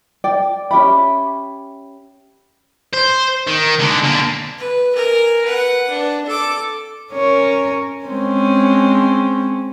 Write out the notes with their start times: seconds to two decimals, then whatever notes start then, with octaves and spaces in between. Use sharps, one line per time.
0.24 D5 G5
0.71 C#4 G4 E5 B5
2.94 C5
3.47 D#3
3.80 D3 G#3
4.04 D3 A#3
4.58 B4
4.96 A#4 G#5
5.45 B4 F#5
5.90 D4
6.26 A4 D6
7.12 C#4 A#4 C#5
8.05 G#3 C4 C#4